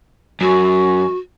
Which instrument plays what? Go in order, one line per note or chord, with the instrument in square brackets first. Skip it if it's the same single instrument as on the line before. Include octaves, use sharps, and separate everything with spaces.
[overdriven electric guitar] F#2 [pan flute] F#4